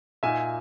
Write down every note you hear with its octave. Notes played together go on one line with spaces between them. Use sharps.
A#2 A#3 D#4 E5 G#5